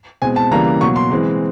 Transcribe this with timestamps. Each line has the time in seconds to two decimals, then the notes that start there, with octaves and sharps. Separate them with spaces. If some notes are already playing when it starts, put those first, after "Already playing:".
0.22 B2 G#3 C4 G#5
0.36 A5
0.51 C#3 E3 G3 A#3 A#5
0.81 B2 F#3 A#3 C#6
0.96 C6
1.11 E3 G#3 C4